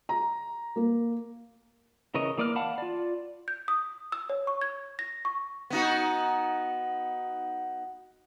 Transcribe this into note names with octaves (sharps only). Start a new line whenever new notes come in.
A#5
A#3
C#3 E3 A#4 C#5 D#5
E3 A#3 D5 D6 F6
F5 F#5 A5 B5
F4 D5
G6
D#6
E6
C#5
C#6
G#6
A#6
C#6
B3 D#4 F#4